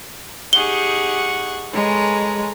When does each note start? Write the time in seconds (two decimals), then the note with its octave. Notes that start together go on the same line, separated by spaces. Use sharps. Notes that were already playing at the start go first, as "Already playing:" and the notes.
0.53 D#4 G4 G#4 F#5 C#6 G7
1.74 G#3 A4 B4 C#5 A#5